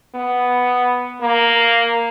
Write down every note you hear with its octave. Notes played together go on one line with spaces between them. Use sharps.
B3
A#3